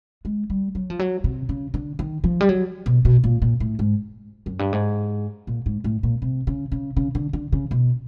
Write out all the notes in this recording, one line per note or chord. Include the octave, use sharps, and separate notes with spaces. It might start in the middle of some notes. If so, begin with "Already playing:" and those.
G#3
G3
F#3
F3
F#3
C3
C#3
D3
D#3
F3
G3
F#3
B2
B2
A#2
A#2
A2
G#2
F#2
G2
G#2
A#2
G#2
A2
A#2
C3
C#3
C#3
C#3
D3
D3
C#3
B2